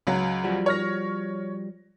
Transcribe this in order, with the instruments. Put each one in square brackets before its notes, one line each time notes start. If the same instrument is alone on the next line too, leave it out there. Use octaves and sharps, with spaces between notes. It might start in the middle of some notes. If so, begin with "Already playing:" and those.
[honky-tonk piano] C#2 F#3
[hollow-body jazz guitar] F3 G3 F#4
[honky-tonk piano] C#5 F6 A#6